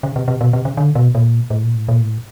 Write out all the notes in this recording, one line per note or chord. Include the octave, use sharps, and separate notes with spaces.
C#3
C3
C3
B2
C3
C#3
D3
B2
A#2
A2
A#2
A2
A#2
A2